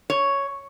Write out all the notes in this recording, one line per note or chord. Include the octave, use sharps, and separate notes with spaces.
C#5